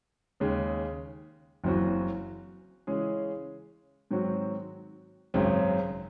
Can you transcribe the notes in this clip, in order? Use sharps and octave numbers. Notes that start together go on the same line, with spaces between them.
D#2 C#3 G#3
F#1 F#2 E3 C4 F#4
C#3 E3 G#3 C#4 G#4
G#2 D#3 F#3 C4 F#4
G#1 F#2 C#3 F#3 C4